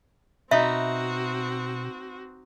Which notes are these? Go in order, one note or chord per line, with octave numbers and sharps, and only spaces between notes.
B2 C4 D#4 F#4 B4 E5